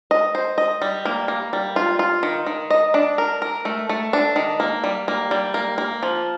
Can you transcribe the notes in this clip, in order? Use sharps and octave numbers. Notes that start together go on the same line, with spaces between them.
D#5
C5
D#5
G3
A#3
A#3
G3
F4
F4
D#3
D#3
D#5
D4
A#4
A#4
A3
A3
D4
D#3
A#3
G3
A#3
G3
A#3
A#3
F3